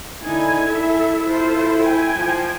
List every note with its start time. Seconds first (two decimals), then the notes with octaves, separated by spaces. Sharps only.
0.23 D3 D#4 E4 G#5
0.66 A4 E5
1.21 F4 A4 C5
1.82 G5 G#5
2.16 F3